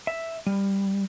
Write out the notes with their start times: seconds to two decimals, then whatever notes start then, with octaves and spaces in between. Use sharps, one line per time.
0.07 E5
0.46 G3